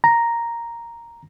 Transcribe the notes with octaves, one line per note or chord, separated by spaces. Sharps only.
A#5